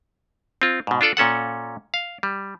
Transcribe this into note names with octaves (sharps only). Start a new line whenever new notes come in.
C4 F4
G#2 B2
D4 F4 A4 D5
A#2 C#4 A4 F#5
F5
G3